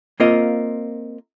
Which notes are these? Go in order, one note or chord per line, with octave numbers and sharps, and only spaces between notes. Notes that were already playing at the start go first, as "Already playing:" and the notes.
A#3 C4 F4 A#4 D#5